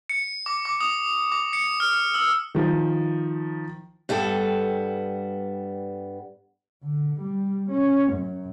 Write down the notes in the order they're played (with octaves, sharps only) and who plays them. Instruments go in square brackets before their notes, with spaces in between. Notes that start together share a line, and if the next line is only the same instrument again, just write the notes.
[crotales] C#7
D6
D6
D#6
D6
C#7
F6
E6
[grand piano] D#3 F3
[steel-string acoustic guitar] G2 G3 B3 A4
[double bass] D3
G3
C#4
F#2